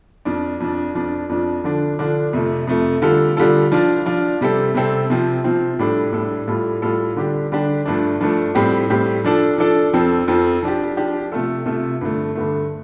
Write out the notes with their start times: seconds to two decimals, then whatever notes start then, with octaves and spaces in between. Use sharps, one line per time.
0.25 F2 F3 D4
0.60 F2 F3 D4
0.95 F2 F3 D4
1.29 F2 F3 D4
1.64 D3 F3 D4
1.99 D3 F3 D4
2.33 F2 C3 A3
2.67 F2 C3 A3
3.02 D3 G3 F4 A4
3.37 D3 G3 F4 A4
3.72 F3 D4 F4
4.06 F3 D4 F4
4.41 C3 G3 C4 A4
4.75 C3 G3 C4 A4
5.10 C3 F3 C4
5.44 C3 F3 C4
5.79 A2 G3 D4 A4
6.13 A2 G3 D4 A4
6.48 A2 G3 F4 A4
6.82 A2 G3 F4 A4
7.16 D3 G3 D4 G4
7.52 D3 G3 D4 G4
7.86 G2 F3 A3 D4
8.20 G2 F3 A3 D4
8.55 A2 G3 C4 G4
8.90 A2 G3 C4 G4
9.25 F3 D4 A4
9.58 F3 D4 A4
9.93 F2 F3 C4 A4
10.28 F2 F3 C4 A4
10.63 F3 D4 G4
10.97 F3 D4 G4
11.32 C3 A3 F4 A4
11.66 C3 A3 F4 A4
12.01 G2 D3 A3
12.35 G2 D3 A3